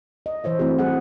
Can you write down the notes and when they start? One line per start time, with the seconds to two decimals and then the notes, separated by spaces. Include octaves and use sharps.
0.26 D#5
0.44 E3 C5 C#5 E5
0.59 A3 C4 E4 F#4 G#4
0.79 G3 G#4 F#5